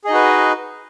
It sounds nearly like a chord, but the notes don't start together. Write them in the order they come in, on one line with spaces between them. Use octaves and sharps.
G#4 D#5 D#4 F#4 B4